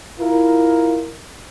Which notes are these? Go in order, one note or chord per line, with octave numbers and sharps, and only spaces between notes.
E4 F4 A#4